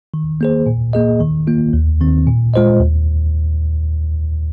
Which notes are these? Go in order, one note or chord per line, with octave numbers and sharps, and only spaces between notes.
D#3
A#3 G#4 C5
A#2
A#3 G#4 D#5
D#3
A#3 F4
D#2
D#3 C4
A#2
G#3 F4 C5 D#5
D#2